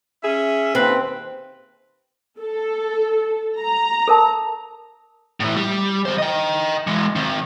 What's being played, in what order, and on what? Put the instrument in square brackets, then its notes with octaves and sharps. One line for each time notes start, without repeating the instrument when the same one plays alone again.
[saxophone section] C#4 G#4 E5
[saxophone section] D#2 B4 [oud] C4
[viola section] A4
A#5
[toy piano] A4 A#4 A5
[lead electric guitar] A2 E3
G3
D#3 C5
D#5 G5
E3 G#3
D#3 C4